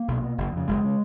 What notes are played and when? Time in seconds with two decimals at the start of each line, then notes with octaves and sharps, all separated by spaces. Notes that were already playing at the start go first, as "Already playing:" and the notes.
Already playing: A#3
0.08 B1
0.23 B2
0.38 F#1
0.53 F2 C#3
0.68 F#1 G#3
0.84 C#3